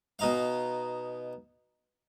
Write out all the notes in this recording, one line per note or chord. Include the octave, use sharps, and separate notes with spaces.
B2 D#4 F5